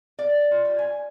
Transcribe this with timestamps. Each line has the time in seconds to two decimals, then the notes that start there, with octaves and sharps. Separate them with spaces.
0.19 D5
0.51 F4
0.65 G3
0.79 G#5